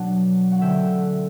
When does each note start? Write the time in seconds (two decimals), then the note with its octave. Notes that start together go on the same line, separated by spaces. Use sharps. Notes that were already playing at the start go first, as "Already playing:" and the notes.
Already playing: B2 F#3 B3 D4 F#5 A5
0.52 F#5
0.61 D3 A3 C#4 E5 G5